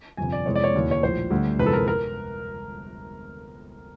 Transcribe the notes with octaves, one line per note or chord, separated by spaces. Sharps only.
G1 F2 C3 G#5
D5
F2 C3 E3 G#3 B3 C#5
D5
C#5
E1 D#2 C#3 E3
C#5
A#1 A2 F3 C5
D2 D3 G3
G1 F2 C3 E3 G#3 B4
A4
A#4
A#4